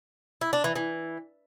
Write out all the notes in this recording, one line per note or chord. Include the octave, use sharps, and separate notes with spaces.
E4
D4
E3
E3